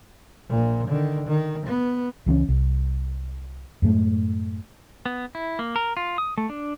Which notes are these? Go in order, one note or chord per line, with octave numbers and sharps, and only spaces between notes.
A#1 A#2
D3 D#3
D#3
B3
C#2 E3 C4 C#4
C2
F#2 A2 G#3 A3
B3
E4
A#3
A#4
F4
D#6
A3
D4